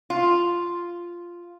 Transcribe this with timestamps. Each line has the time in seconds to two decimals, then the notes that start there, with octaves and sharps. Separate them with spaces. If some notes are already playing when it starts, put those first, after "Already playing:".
0.10 F4